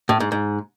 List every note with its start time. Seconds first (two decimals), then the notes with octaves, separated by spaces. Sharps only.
0.09 A2
0.20 G#2
0.32 G#2